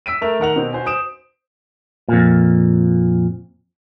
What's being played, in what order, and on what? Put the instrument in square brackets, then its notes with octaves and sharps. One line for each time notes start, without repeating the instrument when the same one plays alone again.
[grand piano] E6 B6 D7 D#7
A3 A#4 E5 F7
D#3 A#4 F#5 F7
B2 C4
F#4 C5 G#5
C5 D#6 D7 E7
[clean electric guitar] F2 A#2